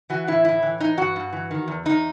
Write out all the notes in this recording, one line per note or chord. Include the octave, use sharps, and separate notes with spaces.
E3 F#4
A2 E4
A2 E4
E3
E3 D#4
G2 F#4
G2
E3
D#3
E2
E2 D#4